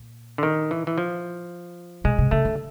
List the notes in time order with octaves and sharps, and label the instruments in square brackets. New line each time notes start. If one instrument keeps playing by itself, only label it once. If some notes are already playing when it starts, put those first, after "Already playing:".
Already playing: [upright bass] A#2
[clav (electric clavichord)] D3
D#3
E3
E3
F3
[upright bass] B2 [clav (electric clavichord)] G#3
[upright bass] C3
[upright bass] C#3 [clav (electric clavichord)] A3
[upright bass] D3